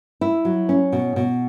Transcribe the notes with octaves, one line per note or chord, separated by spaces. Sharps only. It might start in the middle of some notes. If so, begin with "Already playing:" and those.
E4
F#3
C#4
B2
B2